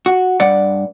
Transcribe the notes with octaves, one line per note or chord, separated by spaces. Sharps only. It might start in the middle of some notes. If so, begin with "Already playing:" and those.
F#4
G2 D5 F#5